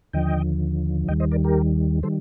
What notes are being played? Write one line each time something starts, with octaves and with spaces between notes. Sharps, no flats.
D#2 D3 F3 D#5 G5
D#2 D#3 G3 D#5 G5
C5 D#5
A#4 D5
G4 A#4
D#3 G3 A4 C5